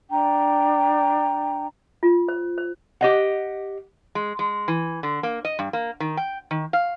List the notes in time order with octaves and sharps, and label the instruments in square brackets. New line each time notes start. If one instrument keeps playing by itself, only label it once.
[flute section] D4 G5 A#5
[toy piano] F4
C5
C5
[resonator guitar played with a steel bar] G4 D#5 F#5
G#3
G#3
E3
D3
A#3
D#5
G2
A#3
D#3
G5
D#3
F5